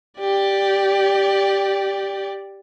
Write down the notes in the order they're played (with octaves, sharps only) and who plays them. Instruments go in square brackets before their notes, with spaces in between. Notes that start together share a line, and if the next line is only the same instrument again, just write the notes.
[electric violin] G4 D5